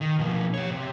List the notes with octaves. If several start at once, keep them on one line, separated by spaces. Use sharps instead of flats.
D#3
B2 F3
G4 C#5
C3